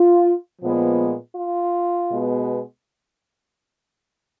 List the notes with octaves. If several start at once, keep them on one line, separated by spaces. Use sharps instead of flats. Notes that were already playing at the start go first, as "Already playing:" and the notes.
Already playing: F4
A#2 F3 G#3 B3
F4
B2 G#3 B3